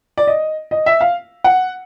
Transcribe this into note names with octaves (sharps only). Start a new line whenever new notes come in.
D5
D#5
D#5
E5
F5
F#5